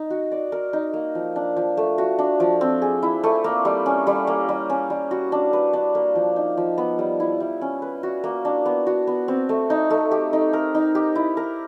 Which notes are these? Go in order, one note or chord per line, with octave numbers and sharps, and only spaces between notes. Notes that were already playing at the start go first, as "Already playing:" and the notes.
Already playing: D#4
F#4
D5
A#4
D#4
A#3
F3
D4
F3
A3
F#4
D4
F3
C4
G#4
E4
A3
A#3
G3
C#4
G3
A#3
G3
C#4
G3
F#4
D4
B4
D4
A#3
F3
D#4
F3
B3
G3
E4
G3
C#4
B4
F#4
A#3
D4
B3
F#4
B3
C4
A3
D#4
A3
G4
D#4
A#4
D#4
G4
E4
A#4